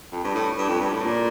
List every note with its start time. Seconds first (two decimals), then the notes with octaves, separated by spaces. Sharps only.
0.12 F2
0.24 G2
0.35 A2
0.58 G2
0.69 F2
0.81 G2
0.93 A2
1.04 A#2